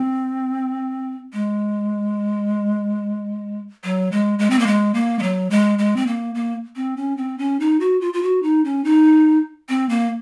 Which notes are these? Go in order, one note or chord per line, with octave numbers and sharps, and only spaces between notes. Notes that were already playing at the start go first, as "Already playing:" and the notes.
Already playing: C4
G#3
F#3
G#3
G#3
C4
A#3
G#3
A#3
G#3
F#3
G#3
G#3
C4
A#3
A#3
C4
C#4
C4
C#4
D#4
F#4
F4
F4
F#4
D#4
C#4
D#4
C4
A#3